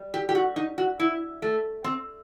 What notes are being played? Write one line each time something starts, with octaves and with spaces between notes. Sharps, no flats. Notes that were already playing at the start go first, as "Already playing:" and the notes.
Already playing: G3
G4
G4
F#4
D#4
F#4
E4
A3
C4